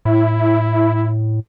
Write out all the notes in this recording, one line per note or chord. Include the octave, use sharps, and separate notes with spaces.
A2 E4